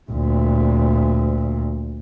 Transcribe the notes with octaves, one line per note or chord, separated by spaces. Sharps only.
D2 A#2